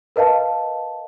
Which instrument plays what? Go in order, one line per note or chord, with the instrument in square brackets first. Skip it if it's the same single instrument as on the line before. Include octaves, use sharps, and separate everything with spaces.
[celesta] A#4 B4 D#5 F5 A5